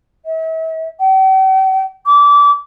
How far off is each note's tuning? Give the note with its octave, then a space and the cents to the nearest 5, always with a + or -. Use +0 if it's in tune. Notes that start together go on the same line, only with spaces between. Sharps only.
E5 -40
G5 -45
D6 -25